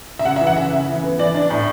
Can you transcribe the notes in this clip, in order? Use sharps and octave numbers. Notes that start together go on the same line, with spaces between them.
E5
C#3 F#5
E5
E3
F#5
C#3 E5
C#3
E3
B3
E3 D5
D4
A2